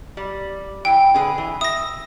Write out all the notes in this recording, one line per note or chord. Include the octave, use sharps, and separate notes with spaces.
G3
E3 G5
D3 G#4 B4
E3
E5 D#6 A#6